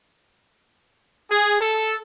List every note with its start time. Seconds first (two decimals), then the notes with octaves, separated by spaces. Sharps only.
1.31 G#4
1.61 A4